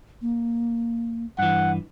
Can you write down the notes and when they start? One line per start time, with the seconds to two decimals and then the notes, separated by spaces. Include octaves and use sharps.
0.21 A#3
1.39 G2 E3 F#5